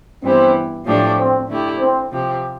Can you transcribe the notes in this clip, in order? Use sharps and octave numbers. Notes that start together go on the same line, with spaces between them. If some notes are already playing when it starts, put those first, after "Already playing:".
G2 E3 B3 C4 E4 G4
A2 F3 A3 D4 G4
C4
D3 A3 E4 G4
C4
C3 F3 C4 G4